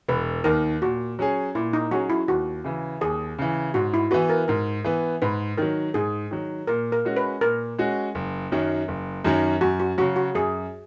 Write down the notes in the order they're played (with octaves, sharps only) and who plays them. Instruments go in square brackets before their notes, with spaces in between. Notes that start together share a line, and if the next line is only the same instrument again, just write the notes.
[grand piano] E1 [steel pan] B4
[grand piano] D#2 D#3 [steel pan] A#4
[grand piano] A#2 [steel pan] F#4
[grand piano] F#3 C#4 G#4
[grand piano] A#2 [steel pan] E4
[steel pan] D#4
[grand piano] F#3 C#4 G#4 [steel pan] F#4
[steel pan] E4
[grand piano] D#2 [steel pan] F#4
[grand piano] C#3 E3
[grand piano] D#2 [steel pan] G#4
[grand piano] C#3 E3
[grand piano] G#2 [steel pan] F#4
[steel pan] E4
[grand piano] E3 B3 [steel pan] F#4
[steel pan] A#4
[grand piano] G#2 [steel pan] A#4
[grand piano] E3 B3
[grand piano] G#2 [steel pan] B4
[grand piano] D#3 F#3 [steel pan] A#4
[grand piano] G#2 [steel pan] G#4
[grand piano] D#3 F#3
[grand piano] A#2 [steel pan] A#4
[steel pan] A#4
[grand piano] G#3 C#4 F#4
[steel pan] B4
[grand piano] A#2 [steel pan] A#4
[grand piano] G#3 C#4 F#4
F#1
F#2 D#3 F#3
F#1
F#2 D#3 F#3
[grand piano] F#2 [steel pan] F#4
[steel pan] F#4
[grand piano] C#3 F#3 [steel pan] F#4
[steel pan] F#4
[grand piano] F#2 [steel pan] G#4